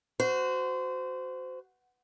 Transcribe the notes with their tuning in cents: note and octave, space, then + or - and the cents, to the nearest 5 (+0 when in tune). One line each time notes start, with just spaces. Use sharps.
F#4 +0 C5 -25